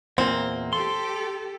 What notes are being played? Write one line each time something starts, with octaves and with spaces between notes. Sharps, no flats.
E2 A#2 A#3 C4
G4 A4 C6